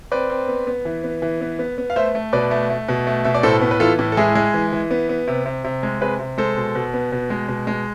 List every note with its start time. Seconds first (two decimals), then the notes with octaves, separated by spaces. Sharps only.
0.12 C4 B4 D5
0.30 C4
0.48 B3
0.67 B3
0.85 E3
1.04 B3
1.22 E3
1.41 B3
1.59 B3
1.78 B3
1.90 F5
1.96 A3 C5 E5
2.15 A3
2.33 B2 B4 D5
2.51 A3
2.70 A3
2.88 B2
3.07 A3
3.24 B2 E5
3.34 D5
3.43 A2 A4 C5
3.62 B3
3.71 B4
3.80 E3 F4 A4
3.99 A2
4.12 A4
4.17 G#3 E4 G#4
4.35 G#3
4.54 E3
4.73 E3
4.91 B3
5.09 B3
5.28 C3
5.46 C3
5.64 C3
5.83 G#3
6.01 C3 G#4 B4
6.20 C3
6.38 G#3 A4 C5
6.57 B2
6.75 B2
6.94 B3
7.12 B2
7.30 G#3
7.48 B2
7.67 G#3